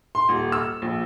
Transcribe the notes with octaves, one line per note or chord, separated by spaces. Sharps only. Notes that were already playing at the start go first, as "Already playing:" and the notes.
C6
D#1
E6
A#1